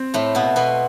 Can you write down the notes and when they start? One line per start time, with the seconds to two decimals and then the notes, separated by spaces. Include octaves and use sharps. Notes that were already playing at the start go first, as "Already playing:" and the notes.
Already playing: C4
0.14 A2 A3
0.35 B2 B3
0.56 B2 B3